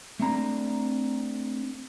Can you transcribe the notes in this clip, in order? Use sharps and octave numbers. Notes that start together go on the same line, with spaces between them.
A3 C4 D4 A#5